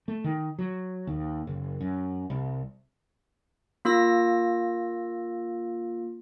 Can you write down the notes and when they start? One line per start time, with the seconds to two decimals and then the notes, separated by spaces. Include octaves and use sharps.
0.08 A3
0.24 D#3
0.59 F#3
1.07 D#2
1.47 F#1
1.80 F#2
2.30 C2
3.85 A#3 F4 E6 A#6